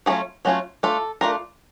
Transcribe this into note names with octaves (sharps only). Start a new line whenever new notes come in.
F#3 A3 C#4 F4 G#4
F#3 A3 C#4 F4
A3 D4 F4 A4
A3 D4 F4 A#4